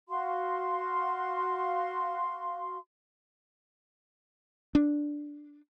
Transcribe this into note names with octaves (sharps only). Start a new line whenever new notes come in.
F#4 F5 C6
D4